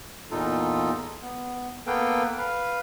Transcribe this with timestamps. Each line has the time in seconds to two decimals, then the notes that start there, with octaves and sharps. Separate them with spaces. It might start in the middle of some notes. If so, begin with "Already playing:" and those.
0.31 E2 A#2 D#4 F4 A4
1.22 B3
1.87 A#3 B3 A4 B4 F5 G5
2.38 B4 F5